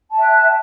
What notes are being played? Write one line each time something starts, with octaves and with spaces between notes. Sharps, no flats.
E5 G5 A5 F#6